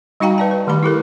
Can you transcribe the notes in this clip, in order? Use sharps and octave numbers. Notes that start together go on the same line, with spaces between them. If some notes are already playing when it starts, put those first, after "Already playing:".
G3 D#4 F#4 F5 G5 A#5
B4 D5 A5
B4
D#3 A3 G4 B5
E4 G4 A4 A#4